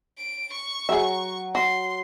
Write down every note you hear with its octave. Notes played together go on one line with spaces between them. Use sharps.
D7
C#6
F#3 G#4 E5
F#4 C6